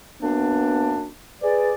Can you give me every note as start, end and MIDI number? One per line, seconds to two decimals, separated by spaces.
0.21 1.09 42
0.21 1.09 58
0.21 0.94 59
0.21 1.09 62
1.42 1.74 68
1.42 1.71 71
1.42 1.74 74